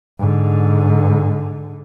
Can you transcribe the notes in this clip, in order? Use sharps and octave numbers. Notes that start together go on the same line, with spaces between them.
G#2 D3